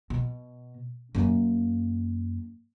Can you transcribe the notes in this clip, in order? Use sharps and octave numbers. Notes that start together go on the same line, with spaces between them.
B2
F#2 A#3